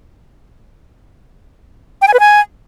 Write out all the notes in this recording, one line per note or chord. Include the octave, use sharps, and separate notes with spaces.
G5
G#5
B4
G#5